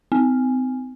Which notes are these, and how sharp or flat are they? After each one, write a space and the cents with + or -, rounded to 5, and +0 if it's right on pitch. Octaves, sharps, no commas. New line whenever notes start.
C4 -35